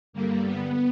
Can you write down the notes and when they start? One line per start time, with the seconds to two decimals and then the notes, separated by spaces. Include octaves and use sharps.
0.13 G2 D3 G3 A#3
0.44 B3